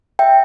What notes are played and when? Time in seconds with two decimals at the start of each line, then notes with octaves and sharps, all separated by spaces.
0.19 E5 G5